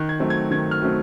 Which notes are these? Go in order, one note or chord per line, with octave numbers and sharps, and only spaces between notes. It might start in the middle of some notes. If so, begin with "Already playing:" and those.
Already playing: D#3 F#6
G#6
F#3 A3 C4
G#6
D#3 G#6
F6
F#3 A3 C4